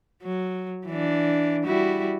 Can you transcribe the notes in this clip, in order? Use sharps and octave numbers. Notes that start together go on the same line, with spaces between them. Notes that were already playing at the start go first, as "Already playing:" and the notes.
F#3
E3 D4
G3 E4 F#4